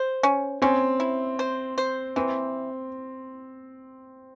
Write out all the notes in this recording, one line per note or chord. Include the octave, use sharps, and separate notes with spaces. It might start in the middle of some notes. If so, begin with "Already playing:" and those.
Already playing: C5
C#4
C4 C#4
E4
C5
C5
E3 C4